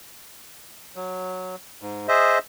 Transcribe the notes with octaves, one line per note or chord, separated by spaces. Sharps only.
F#3
G#2
G#4 C5 D#5 E5